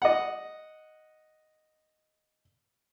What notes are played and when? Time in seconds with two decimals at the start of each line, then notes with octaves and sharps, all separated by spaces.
0.02 D#5 F#5